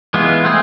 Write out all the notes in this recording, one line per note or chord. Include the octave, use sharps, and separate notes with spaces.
E3 G#3 B3 F4
A3 C4 G#4